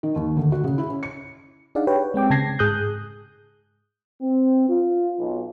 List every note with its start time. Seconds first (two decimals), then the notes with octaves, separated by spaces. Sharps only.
0.03 D#3
0.16 D#2
0.37 D2
0.52 F#4
0.64 C#3
0.78 E4
0.90 C#4
1.03 C#7
1.75 D4 D#4 G#4 D5 F5 F#5
1.87 G4 B4 C#5 G5
2.14 G#3 C4 G5 D6
2.30 C#3 A5 G#6 A#6 C7
2.59 G#2 G#4 D#6 F#6 G6
4.22 C4
4.69 F4
5.19 B1